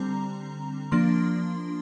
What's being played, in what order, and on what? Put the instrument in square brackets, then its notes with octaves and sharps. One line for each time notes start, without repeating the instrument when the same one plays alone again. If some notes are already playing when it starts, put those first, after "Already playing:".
Already playing: [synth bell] D3 G3 C4 A#5
F3 A#3 D4 C6